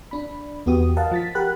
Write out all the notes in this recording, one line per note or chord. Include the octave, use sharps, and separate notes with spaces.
D4 B5
E2 B3 F#4 G4 D#6
A#4 D#5 F5 F#5 A5
F3 A6 B6
G4 A#4 F#5 B5 F#6